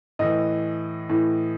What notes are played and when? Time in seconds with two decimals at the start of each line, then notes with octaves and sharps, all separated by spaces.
0.19 A2 E3 D#5
1.09 A2 E3